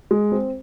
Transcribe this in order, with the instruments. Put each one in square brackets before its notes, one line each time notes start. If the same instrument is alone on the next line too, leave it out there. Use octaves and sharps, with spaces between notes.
[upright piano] G#3
C4